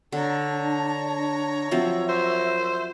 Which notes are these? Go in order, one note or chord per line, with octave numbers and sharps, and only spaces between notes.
D3 D4 C#5 A5 A#5
F3 F#3 C4 E5 E6
C5